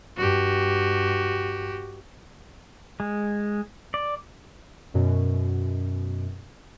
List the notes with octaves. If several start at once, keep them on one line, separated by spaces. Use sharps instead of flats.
G2 F#4 G4
G#3
D5
F#2 B2